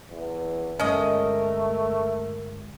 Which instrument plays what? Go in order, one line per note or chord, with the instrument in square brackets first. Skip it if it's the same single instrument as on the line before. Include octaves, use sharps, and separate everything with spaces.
[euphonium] E2
[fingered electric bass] G1 G#3 [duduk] A3 [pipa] C#4 D#5 [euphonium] A#4